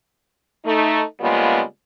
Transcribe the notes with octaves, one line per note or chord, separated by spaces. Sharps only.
A3 D#4
C#3 G3 G#3 A#3 B3 F4